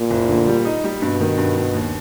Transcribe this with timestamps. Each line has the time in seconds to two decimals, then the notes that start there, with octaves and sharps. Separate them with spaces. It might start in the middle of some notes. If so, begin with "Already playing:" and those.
Already playing: A#2
0.11 F#1
0.29 D3
0.48 G3
0.65 D#4
0.84 G3
1.02 G2 B2
1.21 D#3
1.38 G2
1.57 G2
1.74 D#2